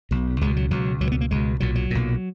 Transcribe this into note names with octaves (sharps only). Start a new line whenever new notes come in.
B1 B2
C#2 B2 G#3
F#3
C#2 B2 F#3
C#2 B2 F#3
B3
A#3
C#2 B2 G#3
B1 A#2 F#3
F#3
B1 A#2